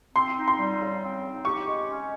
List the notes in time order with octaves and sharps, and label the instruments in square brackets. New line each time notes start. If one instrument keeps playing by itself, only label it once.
[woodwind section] C4 [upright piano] C6
[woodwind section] D#4
[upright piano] C6
[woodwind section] G3
C#3
C4
D#4
[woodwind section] G4 [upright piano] C#6
[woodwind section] G#3
C#4